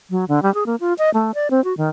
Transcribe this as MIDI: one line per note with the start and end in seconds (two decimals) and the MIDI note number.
0.10 0.25 54
0.28 0.43 50
0.43 0.53 55
0.54 0.64 68
0.66 0.76 58
0.80 0.93 65
0.98 1.10 75
1.14 1.31 57
1.34 1.48 74
1.51 1.63 60
1.64 1.76 66
1.77 1.89 51